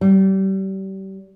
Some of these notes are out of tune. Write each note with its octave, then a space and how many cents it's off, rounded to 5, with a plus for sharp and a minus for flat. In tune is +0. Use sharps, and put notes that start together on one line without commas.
G3 -30